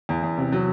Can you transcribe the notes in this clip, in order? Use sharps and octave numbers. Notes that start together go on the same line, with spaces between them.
E2
E2
C3
F#3